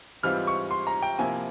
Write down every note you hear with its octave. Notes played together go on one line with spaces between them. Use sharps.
G#2 E3 G3 C4 F4 F6
C#6
C6
A#5
G5
C3 F3 A#3 E4 G#5